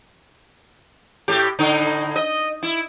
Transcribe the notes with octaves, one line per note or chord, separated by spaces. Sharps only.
A2 G4
A2 D3 D#4
D#5
E4